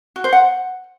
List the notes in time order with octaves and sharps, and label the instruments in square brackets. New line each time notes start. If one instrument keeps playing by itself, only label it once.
[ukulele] F#4
C5
F#5